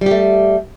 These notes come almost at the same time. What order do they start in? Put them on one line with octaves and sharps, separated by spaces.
G3 G4 A3